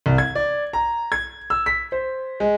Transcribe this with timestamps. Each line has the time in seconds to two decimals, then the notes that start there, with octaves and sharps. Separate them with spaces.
0.06 C2
0.18 G#6
0.35 D5
0.73 A#5
1.12 G#6
1.50 E6
1.66 B6
1.92 C5
2.40 G#3